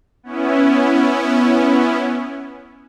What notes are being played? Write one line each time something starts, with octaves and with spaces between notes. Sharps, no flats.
B3 C#4 E4